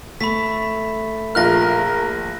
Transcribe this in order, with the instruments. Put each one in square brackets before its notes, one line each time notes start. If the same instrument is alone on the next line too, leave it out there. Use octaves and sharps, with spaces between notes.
[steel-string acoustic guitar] A3 [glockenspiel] B5 B6
[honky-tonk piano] A#1 F4 F6 [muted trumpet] A#4 [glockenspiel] F#6 A#6